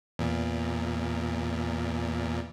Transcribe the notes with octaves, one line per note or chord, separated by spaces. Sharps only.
E2 A#2